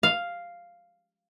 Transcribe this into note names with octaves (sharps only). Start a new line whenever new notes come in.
F5